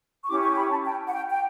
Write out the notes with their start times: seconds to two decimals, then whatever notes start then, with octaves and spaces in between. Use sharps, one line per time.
0.23 C#6
0.28 C#4 E4 G4 D6
0.43 C#6
0.56 B5
0.70 A5
0.84 G5
1.07 F#5
1.12 G5
1.29 G5